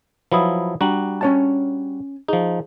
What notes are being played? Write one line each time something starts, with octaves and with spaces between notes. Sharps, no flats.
F3 F#3 E4 B4 B5 D#6
G3 D4 F#4 A#5 F#7
C#4 C#5 A5
F3 D#4 G#4